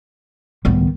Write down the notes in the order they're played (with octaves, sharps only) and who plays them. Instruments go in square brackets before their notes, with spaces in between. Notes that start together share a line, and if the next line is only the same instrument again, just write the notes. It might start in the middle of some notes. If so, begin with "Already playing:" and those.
[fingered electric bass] C#2 A2 G3 [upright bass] D#3 B3